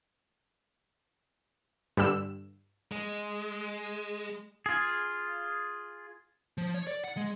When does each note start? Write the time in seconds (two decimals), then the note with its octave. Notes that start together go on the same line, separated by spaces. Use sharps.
1.97 G2 D3 G3 E6 E7
2.92 G#3
4.66 F4 G#4
6.58 F3
6.74 C#5
6.87 D5
7.04 F#5
7.17 G#3